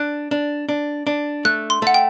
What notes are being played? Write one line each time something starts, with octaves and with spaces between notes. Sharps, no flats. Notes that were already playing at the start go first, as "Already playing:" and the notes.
Already playing: D4 F#6
D4
D4
D4
A3 F#6
C6
A3 F#5
G5